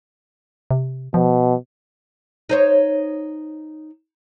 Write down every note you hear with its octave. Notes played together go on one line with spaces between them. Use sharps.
C3
B2 F3
D#4 C5 C#5